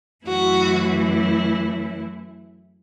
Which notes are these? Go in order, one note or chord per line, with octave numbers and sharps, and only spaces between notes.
F#2 E3 A3 E4 F#4